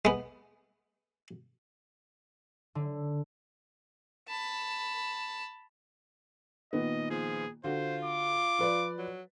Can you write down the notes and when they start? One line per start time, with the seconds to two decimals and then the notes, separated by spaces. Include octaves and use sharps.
0.05 G#3 B3
2.75 D3
4.28 A5 B5
6.73 A#2 D#3 B3 D#5
7.11 F3 G#4
7.64 D3 F4 F#4 C5
8.05 D6
8.59 F3 B4 D5
8.98 F#3